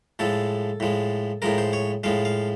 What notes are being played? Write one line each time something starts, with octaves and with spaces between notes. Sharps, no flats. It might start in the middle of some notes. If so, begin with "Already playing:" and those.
A2 F3 G#3 A4
A2 F3 G#3
A2 F3 G#3 A#4
C5
C#5
A2 F3 G#3 F5
F5